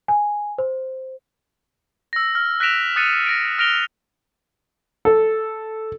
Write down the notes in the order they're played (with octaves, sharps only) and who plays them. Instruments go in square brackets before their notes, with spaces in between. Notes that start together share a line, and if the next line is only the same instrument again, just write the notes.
[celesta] G#5
C5
[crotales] E6 A#6
F6
F#6 A#6 B6 D7 E7 F7
D#6 F#6 A6 C#7 D#7
A#6 D7
F6 A#6 D7 F7 G7
[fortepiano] A4